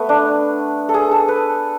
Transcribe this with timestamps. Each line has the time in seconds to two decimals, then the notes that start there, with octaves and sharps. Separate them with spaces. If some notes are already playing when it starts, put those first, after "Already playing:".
Already playing: A3 B3
0.09 D4
0.89 A4
0.94 G#4
1.11 A4
1.28 B4